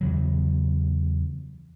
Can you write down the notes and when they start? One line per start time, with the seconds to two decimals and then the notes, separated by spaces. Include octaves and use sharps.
0.01 E2 C#3 F#3